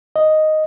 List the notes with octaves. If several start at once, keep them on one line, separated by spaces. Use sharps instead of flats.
D#5